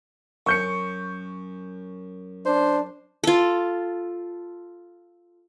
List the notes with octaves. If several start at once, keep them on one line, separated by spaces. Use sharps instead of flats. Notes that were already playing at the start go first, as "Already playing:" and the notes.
F#2 C#6 G6 C#7
D4 C5
F4 A4